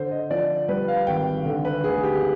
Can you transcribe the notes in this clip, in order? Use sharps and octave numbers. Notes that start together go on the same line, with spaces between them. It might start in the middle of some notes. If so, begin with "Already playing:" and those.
Already playing: D3 C5
D#5
F3 D5
G3 B4
F5
G#1 G5
D3
B4
D2 G#4
G4